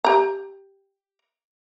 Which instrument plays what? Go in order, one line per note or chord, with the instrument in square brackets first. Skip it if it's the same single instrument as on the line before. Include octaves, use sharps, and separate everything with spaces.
[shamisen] G4 A#5